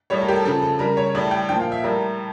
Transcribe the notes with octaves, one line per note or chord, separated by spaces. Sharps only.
A2 G3 C#5
A#4
G4
A4
C#3 F3 A4
A4
C#3 G3 A#4
C#5
A2 G3 D5
G5
A#2 F3 G5
F5
E5
A2 G3 A#4